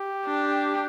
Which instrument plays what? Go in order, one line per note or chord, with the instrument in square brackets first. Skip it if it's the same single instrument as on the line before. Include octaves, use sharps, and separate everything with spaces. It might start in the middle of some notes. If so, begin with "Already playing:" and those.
Already playing: [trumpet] G4
[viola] D4